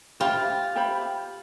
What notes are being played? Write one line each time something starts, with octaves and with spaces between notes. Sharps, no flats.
F4 G4 C5 E5 B5
G4 C5 E5 B5